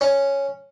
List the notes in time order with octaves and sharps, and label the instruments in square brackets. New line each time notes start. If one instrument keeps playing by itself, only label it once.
[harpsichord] C#4